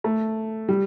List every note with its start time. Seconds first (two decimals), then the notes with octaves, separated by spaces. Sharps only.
0.04 A3
0.69 G3